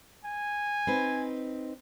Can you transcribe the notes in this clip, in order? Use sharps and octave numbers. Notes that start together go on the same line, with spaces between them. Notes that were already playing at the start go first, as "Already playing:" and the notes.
G#5
C4 D#4 B4